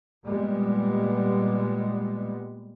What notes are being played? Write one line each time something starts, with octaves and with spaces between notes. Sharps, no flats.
A#2 G3 G#3 B3